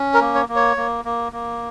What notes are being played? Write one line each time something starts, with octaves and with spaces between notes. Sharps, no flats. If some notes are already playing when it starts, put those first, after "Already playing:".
Already playing: C#4
A#4
A#3
C#5
A#3
C#5
A#3
A#3
A#3